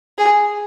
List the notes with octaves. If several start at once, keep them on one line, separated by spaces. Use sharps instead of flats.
G#4